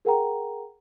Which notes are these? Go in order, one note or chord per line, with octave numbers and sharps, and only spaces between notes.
G#4 A#4 F#5 G5 A#5